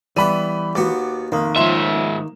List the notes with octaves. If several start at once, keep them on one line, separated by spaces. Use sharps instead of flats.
E3 G3 B3 E5 B5 D#7
D#2 B3 F#4 D6
F1 D#3 A#3
G#2 F3 E5 C6 E7